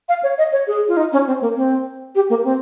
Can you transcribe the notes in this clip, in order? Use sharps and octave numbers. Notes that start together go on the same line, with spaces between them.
F5
C#5
D#5
C#5
G#4
F4
D#4
C#4
C4
A#3
C4
G4
A#3
C4